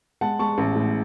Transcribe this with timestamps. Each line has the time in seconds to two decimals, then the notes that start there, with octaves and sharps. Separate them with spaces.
0.21 G#3 F#5 A5
0.39 G#3 A5 C#6
0.58 A1
0.75 A2